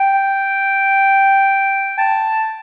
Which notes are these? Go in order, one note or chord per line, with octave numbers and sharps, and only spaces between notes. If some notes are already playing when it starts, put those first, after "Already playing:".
Already playing: G5
A5